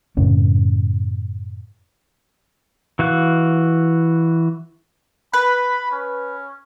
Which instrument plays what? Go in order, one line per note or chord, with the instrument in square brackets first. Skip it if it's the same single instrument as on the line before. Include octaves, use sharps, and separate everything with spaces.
[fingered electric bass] F#2 A2 C#3 C#4
[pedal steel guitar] E3 F#4 F5 F#6
[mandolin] B4 [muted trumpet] B5
[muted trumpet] C#4